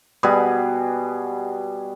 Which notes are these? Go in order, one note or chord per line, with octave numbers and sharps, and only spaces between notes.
B2 G3 G#4 B4